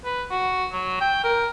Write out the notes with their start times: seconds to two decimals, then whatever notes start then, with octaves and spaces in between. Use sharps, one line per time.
0.05 B4
0.31 F#4
0.73 F#3
1.01 G5
1.24 A#4